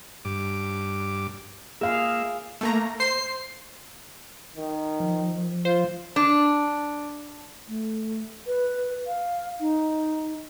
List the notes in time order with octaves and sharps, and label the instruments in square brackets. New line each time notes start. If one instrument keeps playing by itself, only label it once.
[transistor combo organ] G2 D6
[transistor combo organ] A#3 E5 [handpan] G#4 F5
[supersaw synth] A3 A#3 A#5
[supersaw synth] C5 C6 [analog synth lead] C7
[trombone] D#3
[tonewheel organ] F3
[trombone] F4 [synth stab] C5
[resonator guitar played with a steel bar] D4
[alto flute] A3
B4
F5
D#4